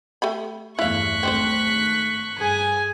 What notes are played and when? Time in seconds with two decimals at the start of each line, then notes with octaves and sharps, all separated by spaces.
0.22 A3 G4 B5
0.79 E2 G2 A3 E4 F5 C#6 F#6 B6
1.23 G#1 A3 C4 D4 C5
2.38 G2 G#4 G#5